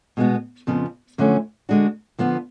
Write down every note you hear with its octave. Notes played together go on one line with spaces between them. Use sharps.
B2 G#3 B3 F#4
F2 C#3 F3 B3
F#2 D3 F3 A3 C#4
D3 G#3 D4 F#4
D3 F3 B3 F4